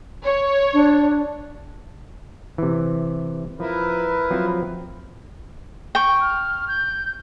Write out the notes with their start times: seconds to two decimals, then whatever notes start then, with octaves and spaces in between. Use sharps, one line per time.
0.24 C#5
0.73 D4
2.58 C3 E3
3.60 F3 E4 A#4 B4
4.31 F3 F#3 C4
5.95 G5 C#6
6.21 F6
6.68 G6